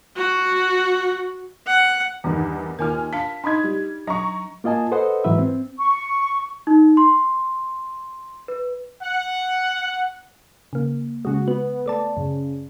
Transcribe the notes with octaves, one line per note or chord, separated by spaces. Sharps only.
F#4
F#5
E2 G2 D#3
D#2 F4 A#4 G#5 F6
D4 F5 A5 B6
D4 D#4 D#5 B5 D#6 G#6
G3
F#3 D4 A#5 C#6
A#3 F4 D#5 G#5 A5
A4 B4 C5 D#5 F#5
G#2 E3 F#3 B4 E5
C4
C#6
D#4
C6
B4
F#5
C#3 A#3
C#3 G#3 F#4
B3 B4
A3 D5 A5
F#2 C#3